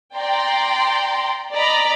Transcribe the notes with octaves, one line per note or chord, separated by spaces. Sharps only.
D5 G5 A#5 C6
D5 D#5 A#5 B5